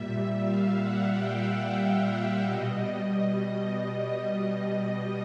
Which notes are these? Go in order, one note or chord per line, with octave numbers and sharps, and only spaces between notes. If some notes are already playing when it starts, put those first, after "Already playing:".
Already playing: A#2 G3 E5
F5
F#5
G5
B2 G3 D#5